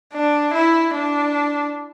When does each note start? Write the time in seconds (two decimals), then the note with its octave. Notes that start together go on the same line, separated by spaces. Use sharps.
0.13 D4
0.54 E4
0.94 D4